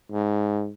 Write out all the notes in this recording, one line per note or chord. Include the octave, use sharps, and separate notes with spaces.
G#2